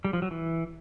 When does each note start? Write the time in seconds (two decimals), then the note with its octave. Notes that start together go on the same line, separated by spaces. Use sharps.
0.05 G3
0.13 F3
0.22 F#3
0.31 E3